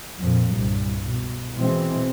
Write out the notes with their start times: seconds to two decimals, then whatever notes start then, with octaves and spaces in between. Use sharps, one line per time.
0.21 F2 A#2
0.53 C2 G2 A#2
1.01 B2
1.56 B2 E3 G#3 C4